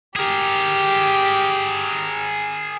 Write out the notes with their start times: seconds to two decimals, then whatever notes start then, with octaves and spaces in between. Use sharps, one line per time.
0.16 G4 G#4 A#4